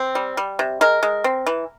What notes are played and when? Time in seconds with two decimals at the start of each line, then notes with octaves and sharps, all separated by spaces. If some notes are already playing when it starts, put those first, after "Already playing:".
Already playing: C4
0.15 G3
0.37 G3
0.59 C3
0.81 G#3 A#4
1.03 G#3
1.24 C4
1.46 E3